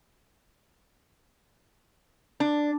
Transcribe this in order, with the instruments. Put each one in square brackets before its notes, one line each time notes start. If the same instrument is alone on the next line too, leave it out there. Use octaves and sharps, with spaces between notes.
[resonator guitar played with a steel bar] D4